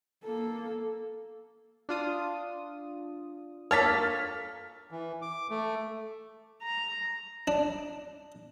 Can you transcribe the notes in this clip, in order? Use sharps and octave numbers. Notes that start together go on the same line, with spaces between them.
A#3 A4
D4 F4 D#6
A#3 A4 C#5 F6 A6 B6
E3
D6
A3
A#5
D4